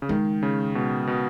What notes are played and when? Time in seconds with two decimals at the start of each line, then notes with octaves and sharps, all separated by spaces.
0.02 C#3
0.09 D#3 G#3
0.43 C#3
0.75 B2
1.07 B2